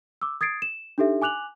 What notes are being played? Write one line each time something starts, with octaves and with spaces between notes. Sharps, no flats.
D6 E6
D#6 G#6 A6 C7 D7
E7
D4 D#4 G4 A4 E5
G#5 D6 F#6 F7 F#7